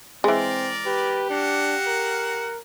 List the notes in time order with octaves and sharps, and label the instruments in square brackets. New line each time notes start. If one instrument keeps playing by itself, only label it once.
[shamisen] E3 G#3 [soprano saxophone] C4 [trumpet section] A#4 D5
[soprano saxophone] G4 [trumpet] B4
[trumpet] D4 [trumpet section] F#4 F5 F#5
[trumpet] A#4